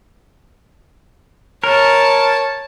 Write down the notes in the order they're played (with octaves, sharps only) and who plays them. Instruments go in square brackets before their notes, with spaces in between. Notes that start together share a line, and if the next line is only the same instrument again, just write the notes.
[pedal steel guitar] A#4 [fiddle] C#5 A5